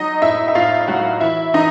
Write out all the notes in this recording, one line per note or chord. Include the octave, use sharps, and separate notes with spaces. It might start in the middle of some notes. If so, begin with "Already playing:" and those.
Already playing: F#3 D#4 D#5
A2 E4 E5
E5
A2 F4 F5
F#3 F#4 F#5
E3 E4 E5
E3 D#4 D#5